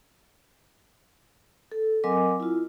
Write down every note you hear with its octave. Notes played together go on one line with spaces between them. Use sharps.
A4
F#3 C4 A#4 D#5 G#5 D6
E4 F4